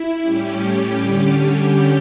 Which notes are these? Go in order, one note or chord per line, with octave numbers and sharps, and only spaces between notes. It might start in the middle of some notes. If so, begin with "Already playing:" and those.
Already playing: E4
A2 G3 C#4 G4
D3 G3 C#4